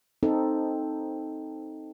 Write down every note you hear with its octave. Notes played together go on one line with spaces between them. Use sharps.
C4 D#4 A4